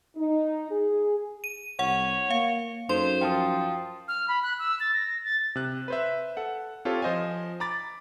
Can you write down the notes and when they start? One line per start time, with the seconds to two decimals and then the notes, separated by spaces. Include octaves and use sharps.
0.16 D#4
0.70 G#4
1.44 D#7
1.79 C2 C#5 F#5
2.31 A#3 F5 C#7
2.89 F#2 D#4 A4 C5 C6
3.21 F3 G5 A5 D#6
4.08 F6
4.28 B5
4.43 F#6
4.59 E6
4.80 A6
4.94 A#6
5.24 A6
5.55 C3 F#6
5.88 B4 C5 E5
6.37 A4 F#5
6.85 C4 F4 G4 A4 C#5
7.02 F3 C5 D#5 F5 G#5
7.60 A#5 B5 D6 A6